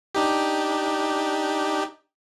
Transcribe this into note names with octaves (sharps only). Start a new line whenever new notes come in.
D4 D#4 G4